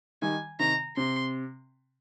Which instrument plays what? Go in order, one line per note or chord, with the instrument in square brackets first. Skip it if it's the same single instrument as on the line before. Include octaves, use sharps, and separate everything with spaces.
[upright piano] D#3 G3 [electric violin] G#5
[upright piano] C3 D#3 [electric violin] A#5
[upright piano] C3 [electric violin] C6